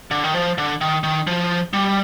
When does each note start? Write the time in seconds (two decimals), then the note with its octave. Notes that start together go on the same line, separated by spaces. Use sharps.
0.11 D3
0.24 D#3
0.34 F3
0.58 D3
0.81 D#3
1.04 D#3
1.27 F3
1.73 G3